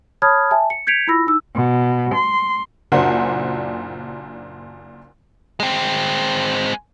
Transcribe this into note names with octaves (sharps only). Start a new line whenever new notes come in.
C#5 A5 B5 D#6 F6 G#6
E5 G#5 A5
C#7
G6 G#6 B6 C#7 D7 F7
E4 F4 B5 E6 A#6
D#4 E6
B2
C6
F#1 A#2 F#3 D4 C5 F#5
G#3 C4